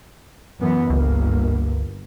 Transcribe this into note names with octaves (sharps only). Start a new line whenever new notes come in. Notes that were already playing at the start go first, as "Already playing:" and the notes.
F#2 E3 B3
G1 C#2 A#3